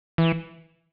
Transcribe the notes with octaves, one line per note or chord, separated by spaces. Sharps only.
E3